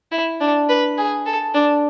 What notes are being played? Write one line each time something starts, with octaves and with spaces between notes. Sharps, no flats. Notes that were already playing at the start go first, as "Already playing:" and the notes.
E4
D4
B4
G#4
A4
D4